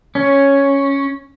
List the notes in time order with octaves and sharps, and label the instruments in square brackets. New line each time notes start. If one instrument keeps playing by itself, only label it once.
[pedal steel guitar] C#4